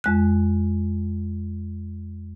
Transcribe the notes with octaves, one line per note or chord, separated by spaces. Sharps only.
F2 G#3 F#6